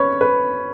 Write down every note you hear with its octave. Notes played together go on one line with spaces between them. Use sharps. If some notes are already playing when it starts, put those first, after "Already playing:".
Already playing: C#4 B4 C#5
B4